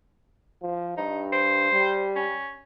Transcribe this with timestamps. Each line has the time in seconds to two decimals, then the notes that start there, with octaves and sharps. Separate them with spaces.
0.62 F3
0.97 G2 D#4
1.33 C5
1.72 G3
2.16 C#4